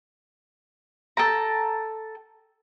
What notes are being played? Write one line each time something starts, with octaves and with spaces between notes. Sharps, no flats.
A4 G5 A#5